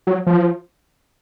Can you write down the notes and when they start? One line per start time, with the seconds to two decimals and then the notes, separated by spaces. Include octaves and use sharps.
0.07 F#3
0.26 F3